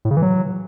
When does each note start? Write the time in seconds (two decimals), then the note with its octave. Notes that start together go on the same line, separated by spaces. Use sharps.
0.05 A2
0.11 C#3
0.16 E3
0.22 F#3